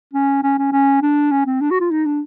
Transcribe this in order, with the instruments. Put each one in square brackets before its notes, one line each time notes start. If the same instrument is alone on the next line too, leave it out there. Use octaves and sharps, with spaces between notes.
[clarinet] C#4
C#4
C#4
C#4
D4
C#4
C4
D4
F#4
F4
D#4
D4